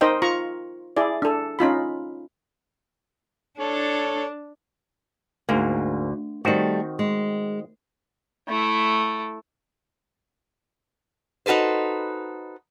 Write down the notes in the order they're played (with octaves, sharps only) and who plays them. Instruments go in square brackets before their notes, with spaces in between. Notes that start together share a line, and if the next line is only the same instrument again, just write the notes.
[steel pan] D#4 A#4 C5 D#5 G5
F4 A#5 C#6
E4 G#4 D5
D4 A4
C#4 D#4 F4 B5
[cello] D4 [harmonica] A4 C#5
[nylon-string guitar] D2 [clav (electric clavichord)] G#2 A#3
[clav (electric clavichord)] D#3 C4 F#4 [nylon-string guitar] G3 A3
[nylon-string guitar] G#3
[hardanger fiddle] A3 E4
[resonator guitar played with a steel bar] D#4 F#4 A4 B4 C5